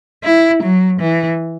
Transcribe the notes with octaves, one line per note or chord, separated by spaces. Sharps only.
E4
F#3
E3